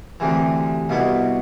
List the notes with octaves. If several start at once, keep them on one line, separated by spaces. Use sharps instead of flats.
D2 C3 E3
C2 B2 B3 E4